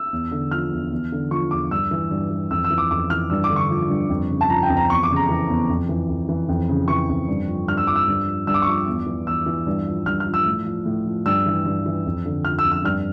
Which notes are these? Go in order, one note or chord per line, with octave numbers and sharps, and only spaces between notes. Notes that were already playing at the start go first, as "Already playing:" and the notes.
Already playing: E6
E2
D3
F3 F6
E2
E2
D3
F3 C#6
E2 D6
G2 E6
E3
G2
E3
F2 E6
E6
E3
D6
F2 D6
E3 F6
G2 E6
D6
D3
C#6
F3
G2
F2
C#3
A5
F3 A#5
G5
F2
A#5
E2 C#6
D6
C#3
A#5
E3
E2
F2
E3
F2
E3
F2
C#3
E3 C#6
F2
G2
F3
G2 F6
E6
F3 D6
E6
G2
F3
G2 E6
D6
C#6
F3 D6
E2
E3
E2 E6
E3
G2
F3
G2 F6
F6
F3
E6
A2
F3
A2
F3
G2 E6
E3
G2
E3
F2
D3
F3 F6
E6
F2
E6
G2 F6